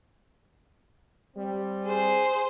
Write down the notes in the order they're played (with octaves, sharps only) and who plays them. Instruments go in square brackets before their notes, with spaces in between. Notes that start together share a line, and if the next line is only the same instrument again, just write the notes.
[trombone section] G3 C4
[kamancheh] G#4 C5